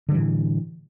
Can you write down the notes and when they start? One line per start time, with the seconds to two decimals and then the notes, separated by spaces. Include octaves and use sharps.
0.09 D3
0.12 G3
0.14 E3
0.17 A2